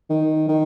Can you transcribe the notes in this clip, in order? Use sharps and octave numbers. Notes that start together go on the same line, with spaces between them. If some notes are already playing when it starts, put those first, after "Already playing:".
D#3
D#3